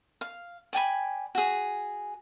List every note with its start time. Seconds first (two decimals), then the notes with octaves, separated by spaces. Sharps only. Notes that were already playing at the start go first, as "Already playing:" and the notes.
0.21 F5
0.73 D5 G5 G#5 B5
1.35 F#4 G#4